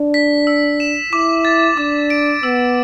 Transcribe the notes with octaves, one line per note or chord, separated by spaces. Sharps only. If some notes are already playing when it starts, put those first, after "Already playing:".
Already playing: D4
B6
E6
E7
E4 D6
A6
D4 D6
D7
B3 E6